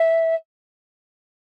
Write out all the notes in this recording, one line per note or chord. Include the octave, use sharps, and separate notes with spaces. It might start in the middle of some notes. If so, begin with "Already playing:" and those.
Already playing: E5